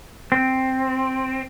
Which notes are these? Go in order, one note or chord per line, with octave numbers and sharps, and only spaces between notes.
C4